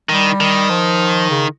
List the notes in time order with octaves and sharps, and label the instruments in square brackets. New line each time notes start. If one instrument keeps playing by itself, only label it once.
[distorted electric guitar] D#3 [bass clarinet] G3
[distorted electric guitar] D#3
[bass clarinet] F3
C#3